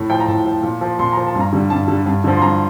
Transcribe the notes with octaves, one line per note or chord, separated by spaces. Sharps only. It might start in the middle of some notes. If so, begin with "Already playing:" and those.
Already playing: A2
F3 G5
A#5
A2 A5
F3
A#2
F3
A#2 C6
F3 A#5
A5
G2
A#5
D3 G3
G2 A5
D3 G3
G2
D3 F3
C6
G2 A#5